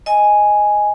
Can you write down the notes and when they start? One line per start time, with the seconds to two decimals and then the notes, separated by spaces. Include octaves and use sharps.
0.06 D#5 G#5